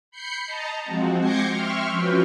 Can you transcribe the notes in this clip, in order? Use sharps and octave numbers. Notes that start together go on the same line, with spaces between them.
B5 G6 C7 C#7
D#5 A5 A#5
F3 G#3 C4 F#4
D6 G6 G#6 A#6 C7 C#7
E5 G5 C6 C#6 F6
F3 C#4 F#4 B4 G5